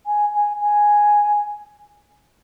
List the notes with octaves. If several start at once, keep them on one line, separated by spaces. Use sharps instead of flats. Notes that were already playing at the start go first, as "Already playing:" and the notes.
G#5
G#5
G#5